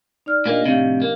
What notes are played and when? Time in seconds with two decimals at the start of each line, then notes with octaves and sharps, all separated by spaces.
0.26 D#4 D5 F6
0.46 A#2 A#3 D4 G4 D#5
0.66 A2 C3 F3 G4 F5
1.02 A#3 C#4